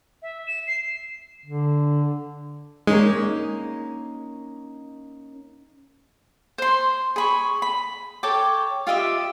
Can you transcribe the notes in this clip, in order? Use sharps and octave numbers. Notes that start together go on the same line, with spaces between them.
E5
E7
C7
D3
G#3 A#3 C#4 D#4
C5 C6
G#4 B5 C#6
B5
A4 C#5 G5 D6
F4 G4 D#5 E5